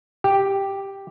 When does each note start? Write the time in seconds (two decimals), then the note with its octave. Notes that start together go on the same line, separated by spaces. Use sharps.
0.24 G4